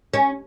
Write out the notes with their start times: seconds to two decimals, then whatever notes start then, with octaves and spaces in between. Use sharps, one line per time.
0.14 C#4